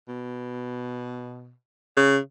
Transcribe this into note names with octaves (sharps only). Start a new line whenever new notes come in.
B2
C#3